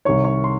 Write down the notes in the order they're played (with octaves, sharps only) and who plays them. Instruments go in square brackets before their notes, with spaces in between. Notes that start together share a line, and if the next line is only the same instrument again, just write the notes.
[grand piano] C2 C3 D#3 C#5 C#6
C#5 C#6
C6